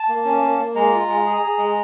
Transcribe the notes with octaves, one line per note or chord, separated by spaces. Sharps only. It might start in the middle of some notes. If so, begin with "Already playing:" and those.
Already playing: A5
A#3
C#4
A#3
A#3
G#3 A#5
F4
G#3
G#4
G#4
G#3